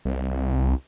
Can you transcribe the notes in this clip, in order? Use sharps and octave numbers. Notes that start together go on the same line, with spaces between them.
C2